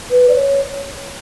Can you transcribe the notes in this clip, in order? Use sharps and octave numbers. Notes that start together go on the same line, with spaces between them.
B4
D5
C#5